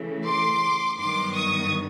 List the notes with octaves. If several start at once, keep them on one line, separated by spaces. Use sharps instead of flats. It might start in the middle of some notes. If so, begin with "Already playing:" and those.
Already playing: C#3 E3 A3
C6 D6
G2 D#3 F#3 B3 C6 D6
C#6 D#6